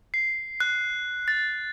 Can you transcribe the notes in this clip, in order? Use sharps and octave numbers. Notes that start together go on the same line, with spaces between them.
C7
F#6
A6